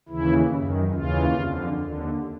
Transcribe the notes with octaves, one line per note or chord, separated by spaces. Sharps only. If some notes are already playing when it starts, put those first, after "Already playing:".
D#2 C#3 E3 E4
F#2 D#3
D#2 C#3 E3 F4
F2 D3
D#2 D3